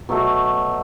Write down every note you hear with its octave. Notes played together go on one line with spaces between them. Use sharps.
B2 F#3 A3